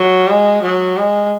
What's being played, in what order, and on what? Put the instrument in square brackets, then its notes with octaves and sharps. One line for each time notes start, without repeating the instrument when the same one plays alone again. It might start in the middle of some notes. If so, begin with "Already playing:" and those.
Already playing: [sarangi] F#3
G#3
F#3
G#3